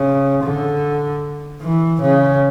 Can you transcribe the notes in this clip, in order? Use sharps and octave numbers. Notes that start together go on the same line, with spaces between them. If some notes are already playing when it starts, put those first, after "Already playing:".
Already playing: C#3
D3
E3
C#3